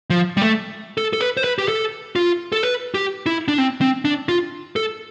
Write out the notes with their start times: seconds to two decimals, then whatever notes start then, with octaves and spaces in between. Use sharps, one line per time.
0.10 F3
0.37 G3
0.42 A3
0.97 A4
1.13 A4
1.21 B4
1.37 C5
1.44 B4
1.58 G4
1.68 A4
2.16 F4
2.52 A4
2.63 B4
2.95 G4
3.26 E4
3.48 D4
3.58 C4
3.81 C4
4.05 D4
4.29 F4
4.76 A4